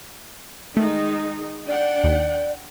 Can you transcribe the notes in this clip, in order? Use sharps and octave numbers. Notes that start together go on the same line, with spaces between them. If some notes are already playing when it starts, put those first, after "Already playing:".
D#3 G#3 A3 D#4
D4 D5 F#5 G5
D#2